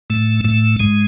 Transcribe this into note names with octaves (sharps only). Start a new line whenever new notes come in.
A2 A3
A2 A3
G#2 G#3